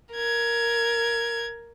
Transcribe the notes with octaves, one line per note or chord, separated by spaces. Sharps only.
A#4 G#6